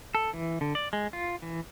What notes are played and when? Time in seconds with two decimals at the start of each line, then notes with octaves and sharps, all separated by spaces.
0.15 A4
0.33 E3
0.61 D3
0.75 D5
0.93 G#3
1.13 F4
1.42 E3